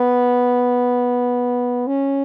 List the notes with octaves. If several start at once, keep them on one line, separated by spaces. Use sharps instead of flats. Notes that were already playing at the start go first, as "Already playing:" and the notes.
Already playing: B3
C#4